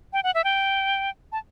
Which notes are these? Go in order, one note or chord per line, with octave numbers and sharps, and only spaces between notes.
G5
F#5
E5
G5
A5